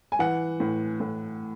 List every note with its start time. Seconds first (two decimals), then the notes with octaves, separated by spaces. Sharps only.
0.12 G#5
0.19 E3 F#5
0.60 A2
1.00 A2